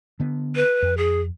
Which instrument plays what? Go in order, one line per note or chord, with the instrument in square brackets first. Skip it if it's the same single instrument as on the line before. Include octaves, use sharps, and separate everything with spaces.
[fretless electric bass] D3 B3
[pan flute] B4
[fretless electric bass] F2
[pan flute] G#4